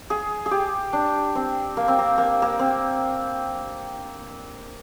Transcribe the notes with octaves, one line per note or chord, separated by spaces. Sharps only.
G#4
G#4
G4
D4
C4
A#3
C4
A#3
A#3
A#3
C4